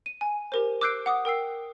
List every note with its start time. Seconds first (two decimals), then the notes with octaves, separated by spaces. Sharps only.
0.06 D#7
0.21 G#5
0.52 G4 A#4 C5
0.81 D6 E6 F#6 G6 C7 D7
1.06 F#5 D6 D#6
1.25 A#4 G5 E6 C7